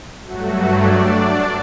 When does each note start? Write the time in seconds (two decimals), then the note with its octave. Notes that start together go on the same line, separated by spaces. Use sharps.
0.24 G2 F#3 A3 F#4
0.69 D4 D5
1.13 D4 D5